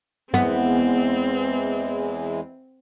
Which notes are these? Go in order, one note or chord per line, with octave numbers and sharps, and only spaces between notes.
E2 E3 G#3 B3 C4